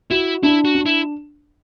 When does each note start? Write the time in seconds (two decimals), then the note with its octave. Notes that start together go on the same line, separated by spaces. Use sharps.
0.11 E4 F#4
0.43 D4 E4
0.65 F#4
0.75 D4
0.86 E4